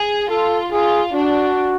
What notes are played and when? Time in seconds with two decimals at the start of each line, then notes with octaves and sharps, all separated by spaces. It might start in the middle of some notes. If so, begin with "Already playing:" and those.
Already playing: G#4
0.30 F4 A4
0.72 F4 G#4
1.14 D4 F#4